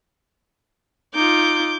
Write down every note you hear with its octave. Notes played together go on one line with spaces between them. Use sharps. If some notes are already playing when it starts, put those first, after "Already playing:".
D#4 F4 D6 G6